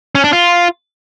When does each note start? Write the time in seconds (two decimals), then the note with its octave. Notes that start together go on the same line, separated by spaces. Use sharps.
0.15 C#4
0.24 D4
0.33 F4